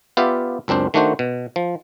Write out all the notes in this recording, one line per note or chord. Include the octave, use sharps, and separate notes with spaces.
B3 F4 G4 D5 E5 F5
C#2 F#2 C4 D4 C5
D#3 A3 D4 F#4 C5
B2
F3